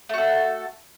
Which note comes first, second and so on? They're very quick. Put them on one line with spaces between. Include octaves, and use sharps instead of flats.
A3 F#4 A4